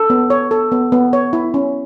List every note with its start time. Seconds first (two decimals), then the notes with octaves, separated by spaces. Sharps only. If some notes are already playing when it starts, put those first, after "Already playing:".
Already playing: A4
0.10 B3
0.30 C#5
0.51 A4
0.72 B3
0.92 B3
1.13 C#5
1.33 E4
1.54 C#4